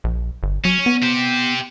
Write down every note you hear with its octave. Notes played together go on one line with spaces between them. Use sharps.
A#1
G1
F#3 C#4
B3
G4 C5